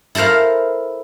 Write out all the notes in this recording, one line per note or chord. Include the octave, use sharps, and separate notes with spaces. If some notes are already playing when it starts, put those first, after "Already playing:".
E4 A4 A#4 C5 F5